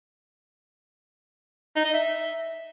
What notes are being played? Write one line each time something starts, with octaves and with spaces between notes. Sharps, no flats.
D#4
D#5
E5